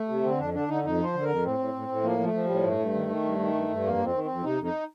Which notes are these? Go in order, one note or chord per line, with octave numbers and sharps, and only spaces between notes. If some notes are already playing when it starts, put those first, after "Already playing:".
Already playing: A3
C3
D3 C4
F2 D4
D3 D4
D3 D#4
F2 D#4
F3
C5
D3
A#4
F2
A2 C4
A2
A2
A2
F3 A#3
F3
A3
F3
A2 G3
G2 A3
G2
D#3
D#3
G2
D#3
G2
G2
F2 A#3
F2
C4
D#3
F2 C4
C3 D#4
F2
D#4